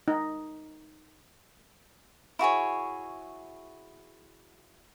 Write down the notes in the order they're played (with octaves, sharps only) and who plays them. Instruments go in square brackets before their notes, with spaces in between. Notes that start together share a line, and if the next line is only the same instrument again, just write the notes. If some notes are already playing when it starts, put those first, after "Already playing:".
[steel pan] D#4
[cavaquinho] E4 F#4 G#4 C#5